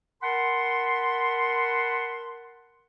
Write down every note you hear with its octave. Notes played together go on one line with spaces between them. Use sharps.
A#4 F#5 A5 B5 C6